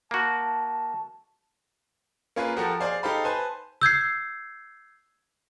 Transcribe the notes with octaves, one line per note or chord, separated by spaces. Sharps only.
A#3 F#4 A5
A#3 C#4 F4 G#4 B4
F3 F#4 G4 A4 A#4
G#4 C5 D5 F5
D#4 G4 A4 C5 F5 B5
B4 C5 G#5 A5
E6 G6 G#6 C7